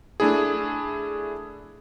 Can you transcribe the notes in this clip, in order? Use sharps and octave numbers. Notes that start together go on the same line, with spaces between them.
A3 D4 E4 G#4